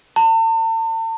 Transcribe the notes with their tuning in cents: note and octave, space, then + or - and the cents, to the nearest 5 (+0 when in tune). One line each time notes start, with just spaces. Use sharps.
A5 +40